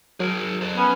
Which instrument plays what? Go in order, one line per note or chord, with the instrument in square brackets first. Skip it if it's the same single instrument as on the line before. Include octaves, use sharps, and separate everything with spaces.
[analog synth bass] F#3 [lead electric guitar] G#4 A#4
[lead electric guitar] A4 C5
[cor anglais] B3 [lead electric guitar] C#4